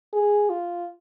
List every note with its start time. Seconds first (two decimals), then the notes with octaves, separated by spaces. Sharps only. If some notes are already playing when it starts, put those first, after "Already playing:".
0.13 G#4
0.50 F4